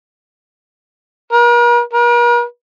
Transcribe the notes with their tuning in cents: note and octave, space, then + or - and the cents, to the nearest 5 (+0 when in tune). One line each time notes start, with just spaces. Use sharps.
A#4 +45
A#4 +45